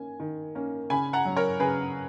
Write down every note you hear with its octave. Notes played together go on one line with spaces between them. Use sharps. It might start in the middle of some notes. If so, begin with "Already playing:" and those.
Already playing: D#3 A#3 C#4 G#5
D#3
A#3 C#4
C#3 G#5 B5
F#5 A#5
F#3 C#4
A#4 C#5
C#3 G#4 B4